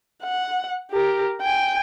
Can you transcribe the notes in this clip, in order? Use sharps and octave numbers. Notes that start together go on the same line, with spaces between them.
F#5
G4 A#4
G5 G#5